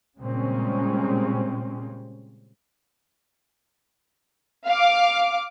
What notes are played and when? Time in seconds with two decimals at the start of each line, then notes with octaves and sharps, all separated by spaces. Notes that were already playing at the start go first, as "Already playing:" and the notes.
0.19 A#2 C#3 G3 G#3 C4 C#4
4.67 F5 D6